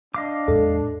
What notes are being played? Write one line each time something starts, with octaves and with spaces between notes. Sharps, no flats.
D4 D#5 F5 D6
E2 A2 G#3 A4